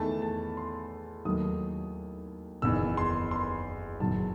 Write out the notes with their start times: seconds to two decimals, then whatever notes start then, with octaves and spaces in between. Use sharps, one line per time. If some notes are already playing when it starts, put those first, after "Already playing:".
Already playing: E2 D#3 A3 A5
0.22 A5
0.57 C6
1.25 D#2 D#3 F#3 A3 D#6
2.62 F#1 E2 D#3 E6
2.97 C6
3.31 C6
4.00 F#1 E2 D#3 F#3 A5